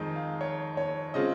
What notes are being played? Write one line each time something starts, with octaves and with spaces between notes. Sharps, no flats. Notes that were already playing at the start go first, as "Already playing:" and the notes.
Already playing: F2 D#3 G#3 D#4
F5
C#5
C#5
C#3 G#3 C4 F4 D#5